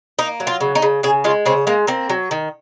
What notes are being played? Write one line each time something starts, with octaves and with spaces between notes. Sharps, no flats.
A#3 D#4
F#3
F4
C#3
D#4
C#3
C#3 G#4
G#3 F4
C#3 C4
G#3 A#3
A#3 C4
F#3
D#3